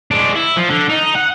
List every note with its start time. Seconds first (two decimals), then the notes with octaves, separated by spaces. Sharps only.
0.11 G#3 D4
0.35 E4
0.57 F3
0.70 D3
0.90 D#4
1.15 F#5